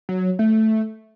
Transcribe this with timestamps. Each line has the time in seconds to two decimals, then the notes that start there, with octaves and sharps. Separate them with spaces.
0.09 F#3
0.39 A3